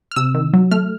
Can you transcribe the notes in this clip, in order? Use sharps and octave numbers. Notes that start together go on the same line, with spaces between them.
F6
C3 E6
D#3
F#3
A3 F6